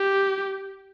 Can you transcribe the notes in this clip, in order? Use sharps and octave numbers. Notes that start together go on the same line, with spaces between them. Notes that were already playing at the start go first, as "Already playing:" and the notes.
Already playing: G4